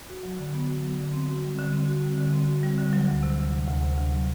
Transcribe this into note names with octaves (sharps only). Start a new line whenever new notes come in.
F#4
F#3
D3
B3
F#4
F#3
D3
C4
F#4
G3
D3
C4
F#4
G3
D3
C4
F#4
G3
D3
F#3
D2
C3
D2
F#3
D2
C3
D2
F#3